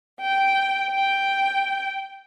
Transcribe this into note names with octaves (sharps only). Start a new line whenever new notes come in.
G5
G5